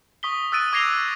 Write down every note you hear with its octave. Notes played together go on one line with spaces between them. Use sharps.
C#6 D#6 B6 G7
D#6 E6 F#6 A6 D7 D#7
D6 G#6 A#6 C7 F7 G7